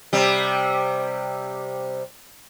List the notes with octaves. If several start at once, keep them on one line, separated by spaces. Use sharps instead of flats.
C3 G3